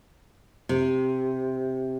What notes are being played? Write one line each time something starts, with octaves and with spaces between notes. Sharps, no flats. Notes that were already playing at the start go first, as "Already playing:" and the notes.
C3